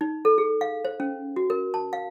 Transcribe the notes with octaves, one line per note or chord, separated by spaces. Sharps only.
D#4
A4
G#4
F5
C5
C#4
F#4
A#4
A5
F5